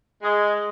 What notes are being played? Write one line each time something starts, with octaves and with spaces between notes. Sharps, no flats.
G#3